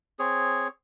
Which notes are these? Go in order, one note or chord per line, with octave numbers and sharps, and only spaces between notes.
C4 G#4 C#5